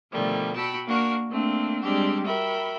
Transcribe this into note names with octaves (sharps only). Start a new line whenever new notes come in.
B2 D3 D#3 F3 G3 A3
F#4 G5 A5 B5 E6
A#3 D4 F#4 A#4
A3 A#3 C4 D4
G3 G#3 C4 D4 G4
F#4 A#4 E5 G5 B5